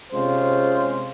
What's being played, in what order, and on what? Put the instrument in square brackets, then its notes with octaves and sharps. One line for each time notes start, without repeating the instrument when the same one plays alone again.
[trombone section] C3 G#3 C#4 F4 C5